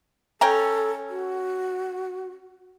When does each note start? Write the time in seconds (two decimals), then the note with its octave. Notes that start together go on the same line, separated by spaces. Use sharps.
0.41 C#4 A4 G5 A#5
1.09 F#4